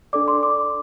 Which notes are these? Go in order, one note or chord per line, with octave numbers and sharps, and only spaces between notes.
D4 A4 D5 D6
C6
D6